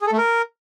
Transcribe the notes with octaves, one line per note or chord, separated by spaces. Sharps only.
G#4
A4
A3
A#4